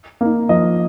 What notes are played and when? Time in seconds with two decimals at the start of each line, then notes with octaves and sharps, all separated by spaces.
0.21 A#3 D#4
0.49 F3 D#5